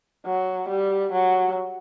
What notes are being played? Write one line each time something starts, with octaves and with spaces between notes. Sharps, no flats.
F#3
G3
F#3